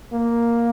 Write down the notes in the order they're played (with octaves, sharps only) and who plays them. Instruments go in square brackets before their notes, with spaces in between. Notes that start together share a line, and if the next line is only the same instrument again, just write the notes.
[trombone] A#3